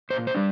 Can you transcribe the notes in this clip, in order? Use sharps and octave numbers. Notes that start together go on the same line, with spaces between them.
A#2 C5
C5
G3 D4